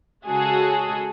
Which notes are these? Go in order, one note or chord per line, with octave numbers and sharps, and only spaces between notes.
C#3 G#3 F#4 G#4 A4